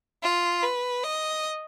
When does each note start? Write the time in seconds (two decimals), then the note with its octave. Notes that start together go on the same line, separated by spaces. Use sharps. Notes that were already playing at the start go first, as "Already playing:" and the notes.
0.23 F4
0.63 B4
1.03 D#5